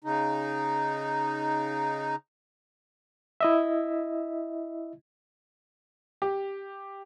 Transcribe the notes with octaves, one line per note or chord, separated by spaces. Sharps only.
C#3 D#4
E4 D#5 E5
G4